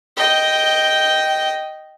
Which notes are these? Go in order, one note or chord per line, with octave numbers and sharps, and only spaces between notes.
D#5 G5